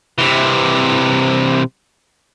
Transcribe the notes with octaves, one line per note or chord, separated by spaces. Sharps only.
C3 E3